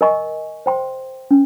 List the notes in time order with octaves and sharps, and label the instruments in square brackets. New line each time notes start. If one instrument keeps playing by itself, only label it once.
[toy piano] A#4 D#5 G#5 C#6
C5 G5 C6
C#4